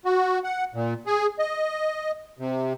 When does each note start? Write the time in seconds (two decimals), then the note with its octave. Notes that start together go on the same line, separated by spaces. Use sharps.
0.05 F#4
0.44 F#5
0.74 A#2
1.07 G#4
1.39 D#5
2.39 C3